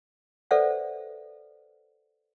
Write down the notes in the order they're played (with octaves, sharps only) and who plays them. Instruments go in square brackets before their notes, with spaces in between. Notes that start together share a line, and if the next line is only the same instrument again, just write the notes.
[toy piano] A4 B4 C5 D5 E5 F#5